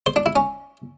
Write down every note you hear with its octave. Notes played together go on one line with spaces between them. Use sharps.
C5
D4
E4
C#4